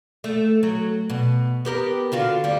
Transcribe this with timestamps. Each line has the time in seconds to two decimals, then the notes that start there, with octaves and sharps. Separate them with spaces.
0.24 A3
0.63 F#3
1.10 B2
1.65 B3 G4 A#4
2.12 D3 F4 F#4
2.44 D2 G3